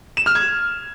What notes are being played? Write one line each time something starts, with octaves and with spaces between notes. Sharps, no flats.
E7
F6
G#6